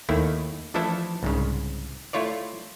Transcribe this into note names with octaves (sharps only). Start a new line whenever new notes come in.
D#2 D#3 A3 E4
E3 F3 A3 D4 E4 A4
C2 G#2 C#3
A3 E4 F4 C#5 D5